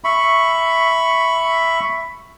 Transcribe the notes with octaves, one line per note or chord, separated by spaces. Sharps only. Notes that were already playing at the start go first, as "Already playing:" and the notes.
E5 B5 C#6